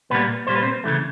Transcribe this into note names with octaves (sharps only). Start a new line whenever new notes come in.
A#2 G3 A#3 B3 B4
A#2 G3 A#3 C5
B4
C4 C5
C#3 E3 A3